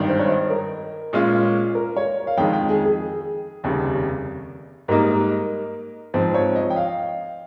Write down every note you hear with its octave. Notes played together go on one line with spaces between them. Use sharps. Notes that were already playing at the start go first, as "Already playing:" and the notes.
Already playing: G#1 G2 D#3
C5
C#5
D#5
A#4
A#2 G#3 C#4 F4
A#4
C#5
F5
F2 D#3 G#3 G5
G5
G#4
G#4
F1 D#2 C#3 G3
G#2 G3 A#3 D#4 A#4
G#2 F3 C4 C5
C#5
D#5
G5
F5